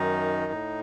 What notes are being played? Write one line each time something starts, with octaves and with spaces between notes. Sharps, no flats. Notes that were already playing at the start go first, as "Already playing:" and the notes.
Already playing: F#2 D#3 D#4
A2